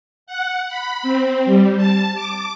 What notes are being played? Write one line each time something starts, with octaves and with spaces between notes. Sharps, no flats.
F#5
B5
C4
G3
A5
D6